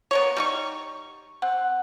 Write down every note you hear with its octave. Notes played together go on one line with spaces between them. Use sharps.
B3 A#4 C#5
G3 D#4 C#6
C4 F#5